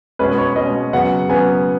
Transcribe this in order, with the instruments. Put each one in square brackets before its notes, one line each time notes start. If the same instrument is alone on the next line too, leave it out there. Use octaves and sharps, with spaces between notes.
[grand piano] B2 G#3 C#4 B4
B4
C#5
B2 G#3 C#4 D#5
C#3 F#3 B3 F#5
C#3 F#3 B3 G#5